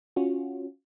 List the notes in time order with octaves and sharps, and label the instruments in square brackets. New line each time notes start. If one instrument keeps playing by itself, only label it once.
[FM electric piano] C#4 F4 F#4